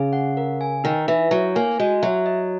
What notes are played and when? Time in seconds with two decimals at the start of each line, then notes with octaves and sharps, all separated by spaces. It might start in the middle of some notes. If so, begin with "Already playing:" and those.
Already playing: C#3 G#4
0.13 F#5
0.37 A#4
0.61 G#5
0.84 D#3 D#4
1.08 E3 E5
1.31 F#3 C#5
1.56 A#3 G#5
1.80 G#3 F#4
2.02 F#3 E5
2.26 D#5